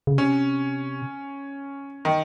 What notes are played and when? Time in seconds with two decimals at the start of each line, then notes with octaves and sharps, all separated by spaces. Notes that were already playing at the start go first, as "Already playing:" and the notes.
0.07 C#3
0.18 C3 C#4
2.05 D#3